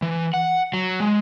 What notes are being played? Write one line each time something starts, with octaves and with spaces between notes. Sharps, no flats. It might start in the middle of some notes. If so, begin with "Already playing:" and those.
E3
F#5
F#3
G#3